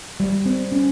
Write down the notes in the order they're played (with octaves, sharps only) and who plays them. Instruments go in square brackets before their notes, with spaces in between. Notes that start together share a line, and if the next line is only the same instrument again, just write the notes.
[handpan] G3
C4
C#4